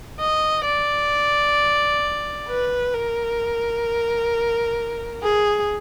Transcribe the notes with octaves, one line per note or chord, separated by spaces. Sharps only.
D#5
D5
B4
A#4
G#4